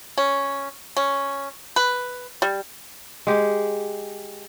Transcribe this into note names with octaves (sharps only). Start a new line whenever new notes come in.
C#4
C#4
B4
G3
G#3 G4